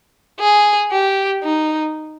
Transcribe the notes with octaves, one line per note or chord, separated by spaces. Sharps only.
G#4
G4
D#4